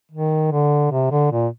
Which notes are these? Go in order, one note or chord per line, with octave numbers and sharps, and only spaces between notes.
D#3
D3
C3
D3
A#2